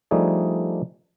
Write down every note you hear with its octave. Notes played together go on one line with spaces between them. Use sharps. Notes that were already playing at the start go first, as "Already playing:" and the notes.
F3 G3 A3 D4 D#4 G#4